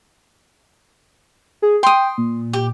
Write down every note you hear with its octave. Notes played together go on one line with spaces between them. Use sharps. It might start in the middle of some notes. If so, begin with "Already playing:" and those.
G#4
G5 C6 D#6
A#2
G4